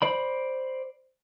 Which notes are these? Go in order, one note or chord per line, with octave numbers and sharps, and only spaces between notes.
C5 D5 B5